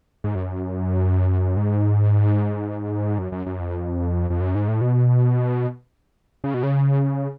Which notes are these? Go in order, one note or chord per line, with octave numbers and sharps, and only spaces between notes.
G#2
F#2
G#2
F#2
F#2
F#2
F2
F2
F#2
G#2
A2
B2
C#3
B2
C#3